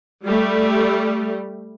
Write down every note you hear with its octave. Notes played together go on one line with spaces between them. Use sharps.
G3 A3